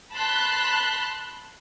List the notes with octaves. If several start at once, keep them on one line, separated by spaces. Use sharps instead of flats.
A5 B5 C6 F#6